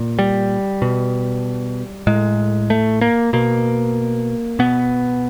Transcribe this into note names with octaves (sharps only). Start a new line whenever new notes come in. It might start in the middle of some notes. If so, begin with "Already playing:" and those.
Already playing: A#2
G3
B2
A2 G#3
A3
A#3
B2 A#3
B2 B3